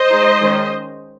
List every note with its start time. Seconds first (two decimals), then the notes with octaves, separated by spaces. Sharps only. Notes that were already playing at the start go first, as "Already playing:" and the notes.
Already playing: C5 D#5
0.09 G#3 D#4
0.41 D#3 G#3 C#4